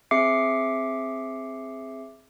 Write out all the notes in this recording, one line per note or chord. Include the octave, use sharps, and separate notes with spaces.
C4 G#4 E5 D6 C7 C#7